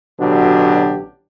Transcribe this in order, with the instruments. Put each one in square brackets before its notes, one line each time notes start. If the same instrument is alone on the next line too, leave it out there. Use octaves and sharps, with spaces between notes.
[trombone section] A1 B2 D3 F#3 D4 G4